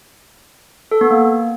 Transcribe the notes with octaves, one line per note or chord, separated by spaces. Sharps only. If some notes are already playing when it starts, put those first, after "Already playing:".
A4
B3
A#3